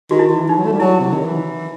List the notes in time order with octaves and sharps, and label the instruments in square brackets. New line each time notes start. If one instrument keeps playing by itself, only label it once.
[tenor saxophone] D#3 [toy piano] F#4
[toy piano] E4
[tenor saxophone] D#3
E3
[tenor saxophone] E3 [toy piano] D#4
[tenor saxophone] F#3
A3
G3
[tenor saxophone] F#3 [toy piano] E4
[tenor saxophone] C3
D#3
E3